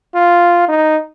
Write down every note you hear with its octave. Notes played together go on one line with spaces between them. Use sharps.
F4
D#4